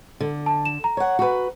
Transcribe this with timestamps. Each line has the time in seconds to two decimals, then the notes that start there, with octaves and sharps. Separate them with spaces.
0.20 D3
0.46 A5
0.65 E7
0.84 A#5
0.97 C#5 F#5
1.19 F#4 B4